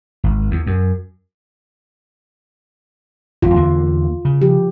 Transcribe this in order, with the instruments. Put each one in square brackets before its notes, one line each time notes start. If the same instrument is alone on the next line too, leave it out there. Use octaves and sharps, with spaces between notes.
[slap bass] G#1
E2
F#2
[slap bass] G#1 F2 [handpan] F4
[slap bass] E2 D3 A#3
C#3
[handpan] F3 G4